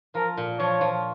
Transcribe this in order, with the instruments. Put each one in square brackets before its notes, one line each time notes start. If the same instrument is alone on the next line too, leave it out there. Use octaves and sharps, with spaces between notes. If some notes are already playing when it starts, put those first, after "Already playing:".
[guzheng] F3 [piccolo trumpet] A#4
[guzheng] A#2
[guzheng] F3 [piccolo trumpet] C#5
[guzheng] F3